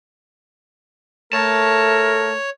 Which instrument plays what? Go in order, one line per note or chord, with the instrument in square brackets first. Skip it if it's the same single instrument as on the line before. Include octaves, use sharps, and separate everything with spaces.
[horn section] A3 [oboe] A#4 [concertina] C#5 [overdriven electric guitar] A5